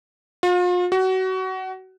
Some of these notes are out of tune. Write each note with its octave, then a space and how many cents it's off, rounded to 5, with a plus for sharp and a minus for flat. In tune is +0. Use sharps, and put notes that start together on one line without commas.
F4 +40
F#4 +25